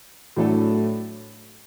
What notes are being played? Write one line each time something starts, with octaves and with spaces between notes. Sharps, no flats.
A2 F#3 A3 D4 A4